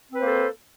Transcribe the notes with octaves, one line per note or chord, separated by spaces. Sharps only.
A#3 C4 A4 B4 C5